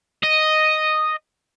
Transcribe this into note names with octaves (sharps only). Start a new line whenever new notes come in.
D#5